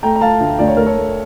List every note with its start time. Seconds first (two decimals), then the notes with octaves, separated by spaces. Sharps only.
0.03 A3 G5 A#5
0.16 A#5
0.21 A3 F5 A5
0.40 D2
0.59 D2 D5
0.68 C#5
0.77 A3 A#4
0.86 A4 C#5
0.97 A3